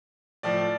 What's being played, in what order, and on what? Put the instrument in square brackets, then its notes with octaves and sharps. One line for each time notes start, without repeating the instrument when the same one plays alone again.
[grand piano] A2 F3 D5